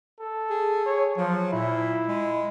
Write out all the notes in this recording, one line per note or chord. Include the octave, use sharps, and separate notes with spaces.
A4
G#4
C#5
F3 F#3
A#2 E4
G#3